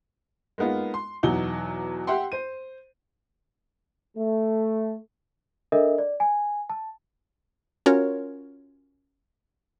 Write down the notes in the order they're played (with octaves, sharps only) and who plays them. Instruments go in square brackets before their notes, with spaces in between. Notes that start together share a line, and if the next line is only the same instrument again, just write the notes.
[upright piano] G#3 A#3 B3 D#4 F4
C6
E2 B2 F#3 D#4 F#5 G7
G4 E5 F#5 G5 C6
C5 D#7
[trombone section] A3
[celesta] D4 A4 A#4 D#5 E5
D5
G#5
A5
[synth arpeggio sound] C#4 F4 F#4 A#4 C#5